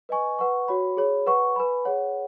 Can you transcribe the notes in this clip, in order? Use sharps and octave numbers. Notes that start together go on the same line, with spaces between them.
B4 D#5 G#5 C#6
B4 F#5 C#6
F#4 C#5 B5
G#4 C#5 B5
B4 F#5 C#6
B4 G#5 B5
G#4 C#5 F#5